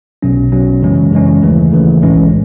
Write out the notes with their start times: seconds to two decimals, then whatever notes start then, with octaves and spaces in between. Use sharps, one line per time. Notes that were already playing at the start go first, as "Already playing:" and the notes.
0.22 B1 B2 F#3 C#4
0.52 B1 B2 F#3 C#4
0.82 F#2 C#3 E3 G#3 C#4
1.12 F#2 C#3 E3 G#3 C#4
1.42 D#2 C#3 E3 A3
1.72 D#2 C#3 E3 A3
2.02 B1 A2 E3 G#3 C#4